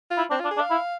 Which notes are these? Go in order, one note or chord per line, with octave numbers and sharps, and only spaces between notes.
F4
E4
C4 D4
F4
D4
G#4
D4
F5
E4